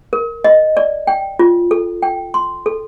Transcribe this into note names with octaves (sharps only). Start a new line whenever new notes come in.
A#4
D#5
D5
G5
F4
A4
G5
C6
A4